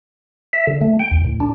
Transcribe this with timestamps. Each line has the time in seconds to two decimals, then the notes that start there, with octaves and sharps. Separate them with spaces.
0.53 E5
0.67 D3
0.81 A3
1.00 G5
1.11 D#2
1.25 A2
1.40 D4